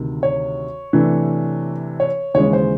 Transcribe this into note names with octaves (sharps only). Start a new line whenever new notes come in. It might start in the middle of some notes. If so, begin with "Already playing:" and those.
Already playing: D2 C3 D#3
C#5
C3 E3 A3 D4
C#5
D#2 C#3 E3 G#3 C#5
C5